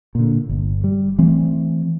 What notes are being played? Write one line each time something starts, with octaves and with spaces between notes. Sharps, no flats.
A#2 D3
G1
G3
E3 A3 C4